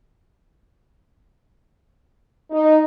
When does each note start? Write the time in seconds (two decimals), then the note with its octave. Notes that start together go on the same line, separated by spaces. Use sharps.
2.51 D#4